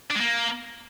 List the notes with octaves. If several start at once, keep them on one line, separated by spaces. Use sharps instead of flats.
D4
G#3
A#3